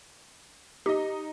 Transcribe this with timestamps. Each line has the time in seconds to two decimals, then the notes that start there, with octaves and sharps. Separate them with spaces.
0.86 D#4 G4 D#5